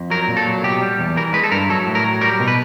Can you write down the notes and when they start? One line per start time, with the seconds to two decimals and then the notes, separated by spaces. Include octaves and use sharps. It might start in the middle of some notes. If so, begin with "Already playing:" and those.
Already playing: F2
0.10 F#3 A#4
0.28 A#2
0.37 A4
0.46 F#3
0.63 B2 G4
0.81 G3
0.98 E2
1.16 E3 A#4
1.33 G#3 B4
1.44 A4
1.51 G2 A#4
1.69 F#3 A4
1.86 A2
1.95 A#4
2.04 F#3
2.21 G3 A#4
2.40 B2
2.48 B4